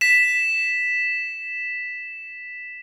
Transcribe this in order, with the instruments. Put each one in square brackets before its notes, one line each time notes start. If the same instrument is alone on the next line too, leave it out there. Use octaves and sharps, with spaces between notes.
[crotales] B6 E7